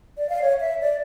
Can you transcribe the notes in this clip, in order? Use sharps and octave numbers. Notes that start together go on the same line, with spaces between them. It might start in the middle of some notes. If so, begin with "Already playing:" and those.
D5
F5
C#5
E5
D5